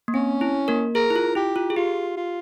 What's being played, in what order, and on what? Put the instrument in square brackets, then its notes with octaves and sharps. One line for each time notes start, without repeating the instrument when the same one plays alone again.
[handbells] A#3
[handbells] C4 [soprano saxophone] C#4
[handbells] E4
A#3 A#4
[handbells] G#4 [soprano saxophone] A#4
[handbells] E4
F4
[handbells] E4 [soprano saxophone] G4
[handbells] F4
G#4
[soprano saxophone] F4 [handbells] G4
[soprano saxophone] F4